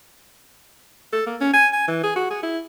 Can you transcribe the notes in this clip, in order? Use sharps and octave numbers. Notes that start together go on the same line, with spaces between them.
A4
A#3
C#4
G#5
G#5
E3
G#4
F#4
G#4
E4